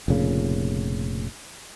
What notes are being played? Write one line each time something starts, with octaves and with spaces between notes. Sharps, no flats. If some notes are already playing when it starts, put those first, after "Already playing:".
F1 A#2 C#3